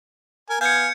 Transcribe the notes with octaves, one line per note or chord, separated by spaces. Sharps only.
A#4 G#5
B3 F5 G#5 G6 G#6 C#7